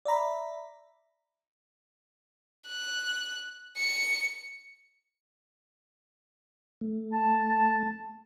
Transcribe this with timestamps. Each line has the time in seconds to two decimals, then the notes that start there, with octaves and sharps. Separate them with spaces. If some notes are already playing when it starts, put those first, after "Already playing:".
0.05 D5 E5 A#5 B5
2.68 F#6
3.78 C#7
6.81 A3
7.13 A5